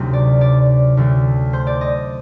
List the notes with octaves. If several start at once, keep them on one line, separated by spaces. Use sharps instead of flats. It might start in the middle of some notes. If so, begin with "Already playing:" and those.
Already playing: D2 C3 F#3 A#3 C4 D#4
D5
D5
D2 D3 F#3 A3
C5
D5
D#5